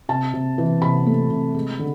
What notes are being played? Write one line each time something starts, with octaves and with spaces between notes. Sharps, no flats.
C3 A5
C3
E3
C3 B5
A3
C3
G#3
D3